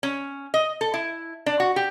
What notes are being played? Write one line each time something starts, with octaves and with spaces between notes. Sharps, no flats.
C#4
D#5
A4
E4
D4
F#4
G4